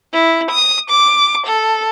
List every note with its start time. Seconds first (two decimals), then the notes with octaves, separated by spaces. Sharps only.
0.13 E4
0.51 D#6
0.91 D6
1.47 A4